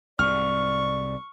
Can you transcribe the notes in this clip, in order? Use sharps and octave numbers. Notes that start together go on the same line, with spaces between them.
C2 G#2 D5 C#6 F6